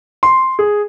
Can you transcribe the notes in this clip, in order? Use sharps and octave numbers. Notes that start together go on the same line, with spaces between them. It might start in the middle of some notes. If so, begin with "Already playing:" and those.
C6
G#4